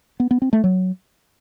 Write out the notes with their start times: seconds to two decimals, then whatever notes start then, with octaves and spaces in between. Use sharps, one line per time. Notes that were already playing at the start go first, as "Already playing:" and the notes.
0.20 B3
0.31 B3
0.42 C4
0.53 A3
0.64 F#3